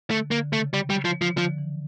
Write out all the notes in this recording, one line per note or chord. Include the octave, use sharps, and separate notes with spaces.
D3 A3
D3 A#3
C#3 A3
G3
G3
F3
F3
D3 F3
F3
E3